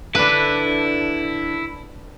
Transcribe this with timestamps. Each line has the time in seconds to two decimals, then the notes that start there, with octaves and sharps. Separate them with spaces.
0.15 D3 D4 E4 B4